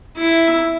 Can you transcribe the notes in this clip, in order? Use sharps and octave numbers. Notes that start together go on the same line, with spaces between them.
E4